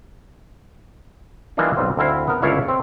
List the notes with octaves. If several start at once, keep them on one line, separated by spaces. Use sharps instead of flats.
E3 G3 A#3 D4 D#4 F4
B1 G3 C4
D2 C4 E4 F5
B3 A#4
G1 C#2 E4 C#5 D5 F5
C4